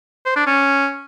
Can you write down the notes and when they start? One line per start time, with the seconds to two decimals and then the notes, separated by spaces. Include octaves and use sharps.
0.26 C5
0.36 D4
0.47 C#4